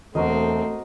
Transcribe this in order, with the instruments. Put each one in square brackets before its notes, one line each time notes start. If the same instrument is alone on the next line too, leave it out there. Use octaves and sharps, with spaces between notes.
[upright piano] E1 [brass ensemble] A3 [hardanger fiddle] C4 [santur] F#4 A#4 D#5